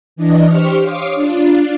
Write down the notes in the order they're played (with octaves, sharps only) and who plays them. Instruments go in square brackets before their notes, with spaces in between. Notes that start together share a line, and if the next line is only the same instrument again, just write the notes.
[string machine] E3 D4 D#5
G4 C5 C#6 F6
C#5 F5 C6 D6 D#6
D4 F4